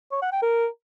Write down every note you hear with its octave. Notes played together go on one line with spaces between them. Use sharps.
C#5
F#5
G5
A#4